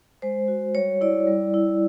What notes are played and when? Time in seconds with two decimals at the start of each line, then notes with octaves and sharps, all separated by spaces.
0.22 G#3 C5
0.48 F#4
0.75 G3 C#5
1.01 E4 D5
1.27 G3
1.54 E4